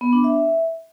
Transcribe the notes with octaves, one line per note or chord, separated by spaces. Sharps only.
B3
D4
E5